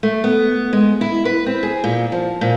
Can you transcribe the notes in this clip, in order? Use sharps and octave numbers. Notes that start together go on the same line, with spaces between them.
A3
B3
G#3
E4
B4
C4
G#4
A#2
F3
A#2